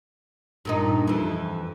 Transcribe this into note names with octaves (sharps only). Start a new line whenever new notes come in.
G2 A#2 D#4
F2 E3